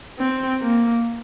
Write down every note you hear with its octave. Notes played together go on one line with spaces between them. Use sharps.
C4
A#3